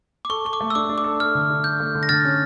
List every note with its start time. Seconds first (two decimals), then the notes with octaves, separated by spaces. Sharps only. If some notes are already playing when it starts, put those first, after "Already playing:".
0.25 D6
0.30 A4 C#6
0.45 A4 C#6
0.53 D6
0.61 A3
0.70 E6
0.75 D4 D6
0.89 D4
0.98 D6
1.04 A4
1.20 A4 F6
1.35 D3
1.50 D4
1.64 A4 G6
1.80 A3
1.95 D3
2.03 A#6
2.09 D3 F6 A6
2.25 C#4